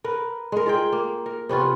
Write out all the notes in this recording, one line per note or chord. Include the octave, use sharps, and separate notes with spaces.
A#4 B4
G#3 A#4
F4 G#4 G5
A#3
A#4
C3 B3 C#4 F4